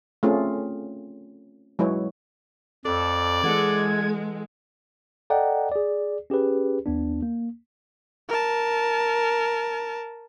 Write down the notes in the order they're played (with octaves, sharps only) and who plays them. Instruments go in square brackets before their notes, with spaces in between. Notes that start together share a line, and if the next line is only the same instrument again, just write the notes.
[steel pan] A3 C4 C#4 F4 G#4
F#3 G#3 E4 B4 C#5
[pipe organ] F2 [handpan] A4 [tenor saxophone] D5
[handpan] E3 A4 F#5 [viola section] G#3 [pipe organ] G#6
[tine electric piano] A4 D5 D#5 F#5 G5 A#5
G#4 D5
C#4 G4 G#4 B4
D#2 B3 D4
A#3
[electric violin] A#4 A5